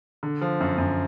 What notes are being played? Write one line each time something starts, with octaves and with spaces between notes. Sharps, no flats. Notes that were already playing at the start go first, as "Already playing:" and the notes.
D3
F3
F#2
F#2